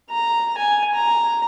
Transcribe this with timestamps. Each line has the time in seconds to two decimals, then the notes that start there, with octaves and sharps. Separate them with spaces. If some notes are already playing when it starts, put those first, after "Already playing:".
0.10 A#5
0.58 G#5
0.95 A#5